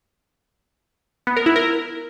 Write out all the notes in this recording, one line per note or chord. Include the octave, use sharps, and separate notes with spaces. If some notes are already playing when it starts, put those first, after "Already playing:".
B3
A#4
E4
A#4